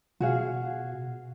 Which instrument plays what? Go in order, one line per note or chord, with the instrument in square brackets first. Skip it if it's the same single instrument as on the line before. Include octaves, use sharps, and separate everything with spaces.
[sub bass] B2 [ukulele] F#4 G#4 F5